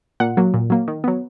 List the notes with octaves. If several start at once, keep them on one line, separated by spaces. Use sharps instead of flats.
A#2 F#5
F#3 A#3
A#2
F#3 A#3
D#3
F#3 B3